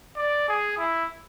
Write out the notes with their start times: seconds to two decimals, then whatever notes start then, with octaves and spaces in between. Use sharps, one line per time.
0.17 D5
0.48 G#4
0.78 E4